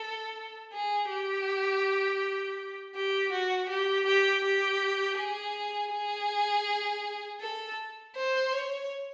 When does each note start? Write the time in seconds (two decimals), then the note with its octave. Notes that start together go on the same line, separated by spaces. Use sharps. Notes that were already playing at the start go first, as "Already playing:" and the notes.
Already playing: A4
0.73 G#4
1.10 G4
2.95 G4
3.32 F#4
3.69 G4
4.06 G4
4.44 G4
5.18 G#4
5.93 G#4
7.41 A4
8.16 C5
8.53 C#5